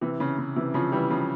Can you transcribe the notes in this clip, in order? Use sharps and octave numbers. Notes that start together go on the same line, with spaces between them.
C3 E3
C#3
C#3
C3 E3
C#3 F3
E3 G3
C#3 F3